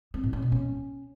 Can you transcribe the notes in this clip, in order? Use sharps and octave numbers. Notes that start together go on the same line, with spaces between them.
C4
A2
C#4
B2
C#4